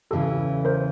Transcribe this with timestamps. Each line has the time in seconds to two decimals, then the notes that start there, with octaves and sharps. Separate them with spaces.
0.11 E2 C#3 E3 G4 A4
0.65 A#4 C5